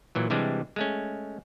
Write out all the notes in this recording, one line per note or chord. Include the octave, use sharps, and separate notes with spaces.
A#2 E3 F#3
C3 E3 G3 G#3 D4
G#3 A3 C#4